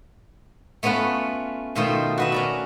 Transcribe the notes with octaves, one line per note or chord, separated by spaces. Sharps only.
A3 B3 C#4 F4 B4
B2 D#3 A3 D#4 F4 C5
F#4 B4 E5
C#4 A#4 D5